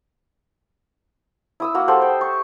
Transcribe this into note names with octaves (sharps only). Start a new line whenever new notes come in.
E4 D#6 E6
A#3 F#4
G4 A4 C5 F#5
G5
C#6